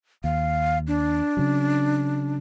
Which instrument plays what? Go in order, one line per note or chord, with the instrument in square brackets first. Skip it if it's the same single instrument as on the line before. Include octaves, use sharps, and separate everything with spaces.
[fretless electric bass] D#2 [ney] F5
[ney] D4
[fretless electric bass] C#3 F#3